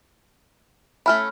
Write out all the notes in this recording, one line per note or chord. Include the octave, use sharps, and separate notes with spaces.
A3 C#4 E4 B5 F6